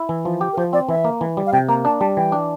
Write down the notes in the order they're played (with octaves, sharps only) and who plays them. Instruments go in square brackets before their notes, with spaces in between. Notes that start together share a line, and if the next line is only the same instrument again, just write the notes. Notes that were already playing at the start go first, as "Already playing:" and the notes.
Already playing: [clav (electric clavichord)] E4
E3
F3
G4
[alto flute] A#4
[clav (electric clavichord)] F3 [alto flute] C5
[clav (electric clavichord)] C4 [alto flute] D5
[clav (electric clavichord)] E3 [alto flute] E5
[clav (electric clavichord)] A#3
E3
G3
[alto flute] F5
[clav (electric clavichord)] C3 [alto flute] G5
[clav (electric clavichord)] A#3 [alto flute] A#5
[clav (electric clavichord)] D4 [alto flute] A5
[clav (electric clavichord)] G3 [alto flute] A5
[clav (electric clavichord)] E3 [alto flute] G5
[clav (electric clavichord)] D4